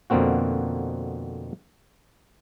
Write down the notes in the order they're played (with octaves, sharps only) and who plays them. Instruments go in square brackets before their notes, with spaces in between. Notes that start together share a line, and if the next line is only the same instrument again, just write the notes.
[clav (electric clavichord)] F2 B2 D3 A#3 C4 F#4